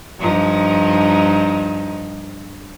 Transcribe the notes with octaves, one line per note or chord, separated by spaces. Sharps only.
G2 F3 D#4